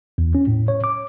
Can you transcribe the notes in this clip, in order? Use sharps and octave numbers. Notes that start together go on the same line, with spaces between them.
E2
C#4
A2
C#5
D6